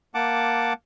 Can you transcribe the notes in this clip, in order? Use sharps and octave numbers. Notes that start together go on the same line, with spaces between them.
A#3 F#5 A5 D6